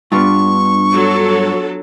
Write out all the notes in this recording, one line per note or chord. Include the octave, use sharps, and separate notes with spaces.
G2 B3 D4 F4 C#6
F#3 A4